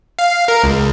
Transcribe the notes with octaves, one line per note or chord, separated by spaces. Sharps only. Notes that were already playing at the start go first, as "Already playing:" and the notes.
F5
A#4
C#2